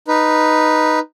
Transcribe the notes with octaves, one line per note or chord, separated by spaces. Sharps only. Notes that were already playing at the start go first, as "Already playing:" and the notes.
D#4 B4